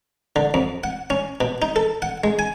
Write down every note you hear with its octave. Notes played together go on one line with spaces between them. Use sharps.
D3
F2
F#5
C#4
B2
D#4
A4
F#5
G#3
G#5